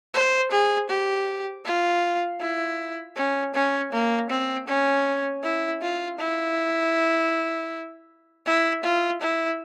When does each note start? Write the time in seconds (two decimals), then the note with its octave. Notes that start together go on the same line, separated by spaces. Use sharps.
0.14 C5
0.51 G#4
0.89 G4
1.65 F4
2.41 E4
3.17 C#4
3.55 C#4
3.92 A#3
4.30 C4
4.68 C#4
5.43 E4
5.82 F4
6.19 E4
8.46 E4
8.84 F4
9.22 E4